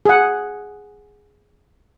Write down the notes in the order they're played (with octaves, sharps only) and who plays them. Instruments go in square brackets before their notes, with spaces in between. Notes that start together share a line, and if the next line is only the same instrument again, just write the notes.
[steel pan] G#4 F#5